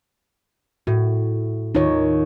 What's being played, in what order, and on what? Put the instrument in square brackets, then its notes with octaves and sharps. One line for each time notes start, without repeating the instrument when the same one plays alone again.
[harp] A2 [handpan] F#4
[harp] D#2 [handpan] D#4 F4 C#5